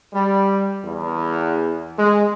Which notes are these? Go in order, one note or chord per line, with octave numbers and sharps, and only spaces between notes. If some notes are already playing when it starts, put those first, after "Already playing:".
G3
E2
G#3